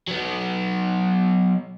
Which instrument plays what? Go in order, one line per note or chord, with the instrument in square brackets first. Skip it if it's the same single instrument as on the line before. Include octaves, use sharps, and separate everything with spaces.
[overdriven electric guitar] F#3 B3